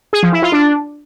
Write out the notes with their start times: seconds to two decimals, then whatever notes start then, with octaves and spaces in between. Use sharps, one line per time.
0.13 G#4
0.23 F3
0.33 E4
0.42 F4
0.52 D4